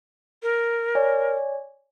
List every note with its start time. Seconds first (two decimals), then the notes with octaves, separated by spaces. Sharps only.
0.43 A#4
0.95 C#5 D5 G#5